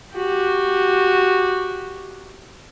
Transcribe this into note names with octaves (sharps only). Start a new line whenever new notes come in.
F#4 G4